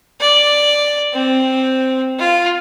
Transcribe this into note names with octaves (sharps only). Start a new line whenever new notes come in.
D5
C4
F4